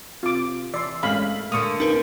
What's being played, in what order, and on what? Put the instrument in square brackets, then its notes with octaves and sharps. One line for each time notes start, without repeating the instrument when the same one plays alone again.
[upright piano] C3 [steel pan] F4 D6
[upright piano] E3 [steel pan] D5 C6 [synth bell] E6
[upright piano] G#1 A3 F#7 [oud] G#3 [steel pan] C#4 F5 B5
[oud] D3 A#3 [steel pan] C#6 D#6
[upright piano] C#2 [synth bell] D#4 A#4 B4